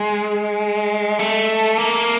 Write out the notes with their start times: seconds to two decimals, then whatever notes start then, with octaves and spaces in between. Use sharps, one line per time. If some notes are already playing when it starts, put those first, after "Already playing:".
Already playing: G#3
1.19 A3
1.78 A#3